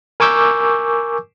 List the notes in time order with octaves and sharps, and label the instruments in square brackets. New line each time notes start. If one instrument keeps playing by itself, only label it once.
[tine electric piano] A#4 G#5 C#6 D6 E6 G6